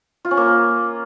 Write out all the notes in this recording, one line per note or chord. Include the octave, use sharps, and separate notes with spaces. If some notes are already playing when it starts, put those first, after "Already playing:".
F4
C#4
A#3